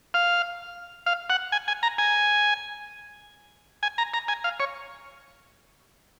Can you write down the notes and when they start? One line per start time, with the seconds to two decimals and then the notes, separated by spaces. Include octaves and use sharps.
0.14 F5
1.06 F5
1.30 F#5
1.52 G#5
1.68 G#5
1.83 A#5
1.98 G#5
3.83 G#5
3.98 A#5
4.14 A#5
4.28 G#5
4.44 F5
4.60 C#5